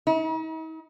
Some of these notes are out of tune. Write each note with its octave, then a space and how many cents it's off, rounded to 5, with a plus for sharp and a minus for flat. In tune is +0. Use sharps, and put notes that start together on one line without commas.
D#4 +45